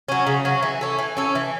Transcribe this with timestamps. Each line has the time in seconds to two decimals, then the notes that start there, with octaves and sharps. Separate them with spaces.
0.08 F#3 C#4
0.27 C#3
0.45 F#3 C#4
0.63 E3
0.81 C#4 A4
0.99 E3
1.17 C#4 A4
1.35 E3